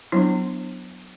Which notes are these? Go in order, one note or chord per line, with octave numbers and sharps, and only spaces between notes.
F#3 B3 D4 E4